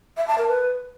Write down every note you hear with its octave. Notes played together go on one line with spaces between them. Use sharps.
E5
A5
A#4
B4